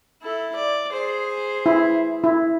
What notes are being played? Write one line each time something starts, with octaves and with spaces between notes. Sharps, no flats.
E4 A4
D5
G#4 C5
E4
E4